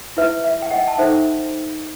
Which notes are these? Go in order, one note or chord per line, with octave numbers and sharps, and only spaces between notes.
E4 B4 E5
E5
G5
D#5 F#5
A5
D#4 A4 C5 E5 G5